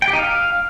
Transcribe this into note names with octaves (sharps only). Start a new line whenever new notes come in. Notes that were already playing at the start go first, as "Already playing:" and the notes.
G5
G4
D#4
F5